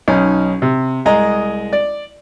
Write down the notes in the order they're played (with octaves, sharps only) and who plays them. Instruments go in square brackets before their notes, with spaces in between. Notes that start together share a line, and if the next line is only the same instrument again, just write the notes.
[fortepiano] B1 C#4 D#4
C3
C2 G#3 D#5 A#5
D5